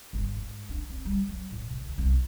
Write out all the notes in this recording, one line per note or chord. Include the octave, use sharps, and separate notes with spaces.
G1
G#2
D4
C4
G3
F#3
A2
C3
D2
C2
F2